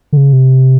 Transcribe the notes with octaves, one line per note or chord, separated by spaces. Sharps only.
D3
C#3
C3